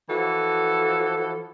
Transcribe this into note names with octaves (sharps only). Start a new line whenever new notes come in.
E3 F3 F#4 A4